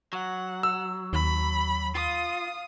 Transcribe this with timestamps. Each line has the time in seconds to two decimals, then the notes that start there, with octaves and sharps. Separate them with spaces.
0.13 F#3 F#5
0.63 E6
1.13 D#2 B5
1.95 F4 F5 D#6